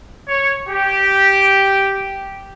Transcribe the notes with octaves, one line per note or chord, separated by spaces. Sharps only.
C#5
G4